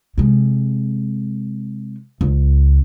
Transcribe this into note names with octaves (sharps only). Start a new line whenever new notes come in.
C3 G#3
C#2